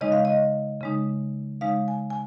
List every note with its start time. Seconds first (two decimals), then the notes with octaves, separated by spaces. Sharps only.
0.01 C#3 G#3 D#4 D#5
0.12 F5
0.25 D#5
0.81 C#3 G#3 D#4
1.61 C#3 G#3 D#4 F5
1.88 G#5
2.10 G#5